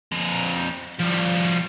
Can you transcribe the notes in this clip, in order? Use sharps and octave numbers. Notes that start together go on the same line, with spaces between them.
F2 A#5
F3 G3